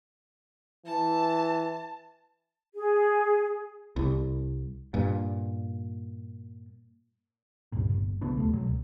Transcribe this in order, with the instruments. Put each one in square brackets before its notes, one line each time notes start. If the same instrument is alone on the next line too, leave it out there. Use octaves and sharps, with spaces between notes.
[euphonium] E3 [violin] A5
[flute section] G#4
[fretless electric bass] C2
G2 A#2
[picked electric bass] C#2 G2 A#2
G1
B1 C#3 B3 D4
D#2 A3
B2 F#3
C#2